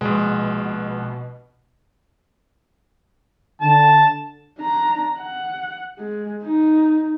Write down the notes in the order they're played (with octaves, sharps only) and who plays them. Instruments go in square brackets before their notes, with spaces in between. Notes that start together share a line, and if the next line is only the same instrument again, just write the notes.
[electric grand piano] A#1 G#3 [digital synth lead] B2
[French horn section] D3 [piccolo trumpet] A5
[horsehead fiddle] D4 A#5
F#5
G#3
D#4